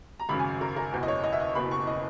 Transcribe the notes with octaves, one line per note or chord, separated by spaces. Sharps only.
A#5
G#1 F#2 C#3 B5
G#5
A#4
A#4
F#1 E2 B2
D#5
C#5
D#5
E5
D#5
F#1 E2 B2 B5
C#6
D#5